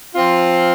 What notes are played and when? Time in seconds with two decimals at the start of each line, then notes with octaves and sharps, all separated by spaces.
0.14 F3 C4 F4